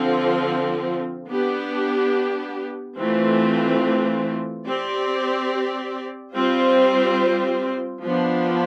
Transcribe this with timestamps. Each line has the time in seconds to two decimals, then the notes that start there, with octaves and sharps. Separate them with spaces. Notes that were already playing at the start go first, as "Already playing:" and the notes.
Already playing: D3 F3 C4 F4
1.28 B3 D4 G4
2.98 E3 A3 C4 F4
4.67 C4 G4 D5
6.35 G3 C4 F4 C5
8.04 F3 B3 D4